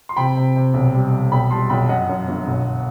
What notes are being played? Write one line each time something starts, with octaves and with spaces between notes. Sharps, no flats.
C6
C3 G5 B5
C3
C3
B1
G3
G3
B1 G5 B5
G3 A5 C6
B1 G5 B5
F#2 D#5 F#5
F#2
G1
B1